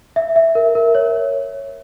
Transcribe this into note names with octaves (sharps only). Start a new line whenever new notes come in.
E5
E5
A#4
A#4
C#5